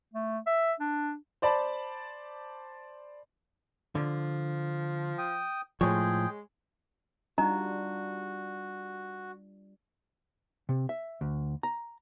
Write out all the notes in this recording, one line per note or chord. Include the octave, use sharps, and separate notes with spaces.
A3
E5
D4
C5 D5 A5 B5
D3 F3
G5 D#6
A2 F3 G#3 G#4 C#5 G5
G3 D4 D#4 F4 F#4 D#5 A#5
C3
E5
D2
A#5